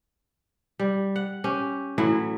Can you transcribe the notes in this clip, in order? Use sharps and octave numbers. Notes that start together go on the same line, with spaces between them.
G3
F#5
C#4 G4
A2 E3 F#3 E4